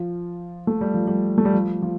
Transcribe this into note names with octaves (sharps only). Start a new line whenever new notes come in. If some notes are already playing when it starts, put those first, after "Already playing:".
Already playing: F3
A3
G3
F3
G3
A3
G3
F3
F3